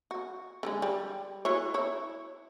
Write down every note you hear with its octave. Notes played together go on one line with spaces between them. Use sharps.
F#4
D3 F#3 G#3
G3
E4 F#4 C#5
E4 C#5